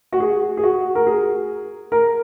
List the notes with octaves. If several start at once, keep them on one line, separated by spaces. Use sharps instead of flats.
F#4
G#4
G#4
F#4
A#4
G#4
A#4